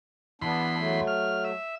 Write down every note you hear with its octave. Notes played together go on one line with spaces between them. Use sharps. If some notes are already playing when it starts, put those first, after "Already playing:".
E2 B3 D4 B5 C6
F#3 A3
F6
E5